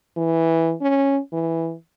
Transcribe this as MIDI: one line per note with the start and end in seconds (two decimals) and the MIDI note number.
0.17 0.73 52
0.81 1.19 61
1.32 1.74 52